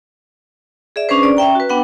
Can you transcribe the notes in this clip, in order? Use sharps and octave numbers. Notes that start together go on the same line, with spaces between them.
G#4 D5 E5
C#4 D4 G#4 B4 C5
D5
C#4 E5 G5 A#5
F#4 B4
B3 D4 F#5 G5